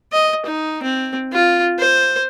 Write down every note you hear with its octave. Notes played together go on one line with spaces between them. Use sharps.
D#5
D#4
C4
F4
C5